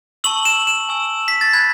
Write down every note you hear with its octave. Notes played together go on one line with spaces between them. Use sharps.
A5 C#6 E6 F#7
E7
E7
G#5 C#6 E6
B6
A6
B5 F#6 G#6